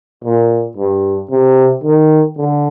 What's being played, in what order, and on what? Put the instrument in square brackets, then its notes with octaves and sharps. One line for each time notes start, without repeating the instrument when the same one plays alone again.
[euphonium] A#2
G2
C3
D#3
D3